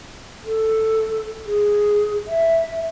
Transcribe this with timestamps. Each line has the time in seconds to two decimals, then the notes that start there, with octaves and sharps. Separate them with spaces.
0.45 A4
1.46 G#4
2.28 E5